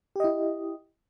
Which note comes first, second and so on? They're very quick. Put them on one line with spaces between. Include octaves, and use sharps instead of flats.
G4 D#5 E4